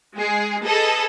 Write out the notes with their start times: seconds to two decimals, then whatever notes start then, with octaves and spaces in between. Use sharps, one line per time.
0.17 G#3 G#4
0.65 G#4 A4 B4 D#5